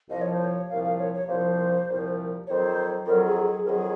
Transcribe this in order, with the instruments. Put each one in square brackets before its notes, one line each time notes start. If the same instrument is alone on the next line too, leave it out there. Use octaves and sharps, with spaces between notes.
[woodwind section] C2 A#2 F3 [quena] D#5
[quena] C#5
C5
C#5
[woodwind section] C2 A#2 F3 [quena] F5
[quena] F5
C#5
C#5
[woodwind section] C2 A#2 F3 [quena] C5
[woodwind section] C2 A#2 F3
[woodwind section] F2 D#3 F#3 [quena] C5 C#5
[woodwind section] F2 D#3 F#3 [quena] A#4
[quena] G#4
G#4
[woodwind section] F2 D#3 F#3 [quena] G#4 A#4